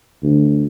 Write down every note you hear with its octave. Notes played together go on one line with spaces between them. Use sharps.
D2